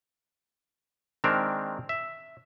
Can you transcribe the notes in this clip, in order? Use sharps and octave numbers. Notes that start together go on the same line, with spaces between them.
D#3 G#3 C4 D4 A#4
E5